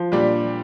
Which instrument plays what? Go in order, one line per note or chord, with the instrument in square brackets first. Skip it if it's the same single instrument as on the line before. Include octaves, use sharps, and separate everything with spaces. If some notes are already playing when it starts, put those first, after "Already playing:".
Already playing: [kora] F3
[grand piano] A#2 G3 D4 G4